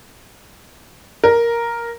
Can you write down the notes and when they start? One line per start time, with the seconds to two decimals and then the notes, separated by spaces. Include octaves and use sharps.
1.24 A#4